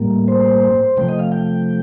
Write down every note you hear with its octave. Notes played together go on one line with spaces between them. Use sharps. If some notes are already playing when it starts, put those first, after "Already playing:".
Already playing: A2 G3 A#3
C5
C3 F3 A3 G5
D#5
F5
G5